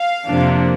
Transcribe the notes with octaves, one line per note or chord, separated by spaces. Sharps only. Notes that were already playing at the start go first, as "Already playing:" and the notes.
Already playing: F5
F2 C3 F3 A#3 D4